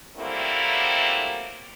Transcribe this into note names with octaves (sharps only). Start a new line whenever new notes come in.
F#3 G3 A3 A#3 C4 E4